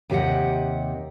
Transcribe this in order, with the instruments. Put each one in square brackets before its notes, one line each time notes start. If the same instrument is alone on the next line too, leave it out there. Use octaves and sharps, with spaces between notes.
[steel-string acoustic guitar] D#2 C3 G4 D#5 F#5